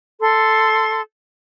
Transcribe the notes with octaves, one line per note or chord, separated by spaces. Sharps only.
A4 C6